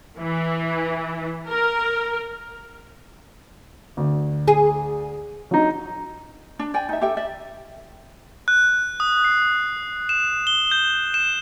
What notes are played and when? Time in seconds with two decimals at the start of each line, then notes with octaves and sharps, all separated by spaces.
0.19 E3
1.48 A#4
3.97 D2
4.48 G#4
5.51 F#3 D#4
6.59 D4
6.74 D5 G5 G#5
6.89 D#4 E5
7.01 G4 A4 E5 G5
7.17 D5 E5
8.48 F#6
9.00 D#6
9.24 C7
10.09 E7
10.47 G7
10.71 G6
11.14 E7